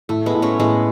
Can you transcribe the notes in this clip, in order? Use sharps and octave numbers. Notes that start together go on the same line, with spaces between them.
A2 A3
G#3 B3
A2
A3 C#4
A2 G#3 B3